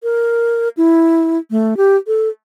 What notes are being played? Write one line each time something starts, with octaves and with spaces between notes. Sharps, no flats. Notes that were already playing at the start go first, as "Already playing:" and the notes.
A#4
E4
A3
G4
A4